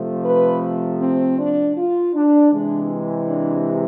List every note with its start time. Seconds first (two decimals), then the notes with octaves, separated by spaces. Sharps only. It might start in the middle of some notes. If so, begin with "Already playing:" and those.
Already playing: C3 F3 A3
0.25 B4
1.01 C4
1.38 D4
1.76 F4
2.14 D4
2.52 C3 E3 G#3 D4
3.27 D4